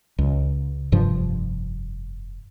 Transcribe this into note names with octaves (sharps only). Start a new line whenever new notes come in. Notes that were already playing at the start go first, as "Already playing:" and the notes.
C#2
F1 G2 C3 F3